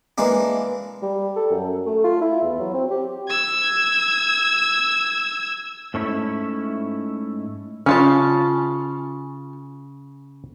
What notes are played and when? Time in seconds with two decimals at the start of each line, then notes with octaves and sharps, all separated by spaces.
0.18 E3 G#3 A#3 D4
1.02 G3
1.36 A4
1.51 F#2
1.86 A3
2.04 F4
2.21 E4
2.43 E2
2.60 F#3
2.74 C4
2.91 G4
3.28 E6 G#6
5.94 G#2 A3 C#4 E4
7.86 C#3 C#4 F4 A5